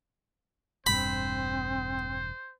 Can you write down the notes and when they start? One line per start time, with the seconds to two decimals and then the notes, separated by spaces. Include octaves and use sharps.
0.87 E1 G2 C4 C5 B5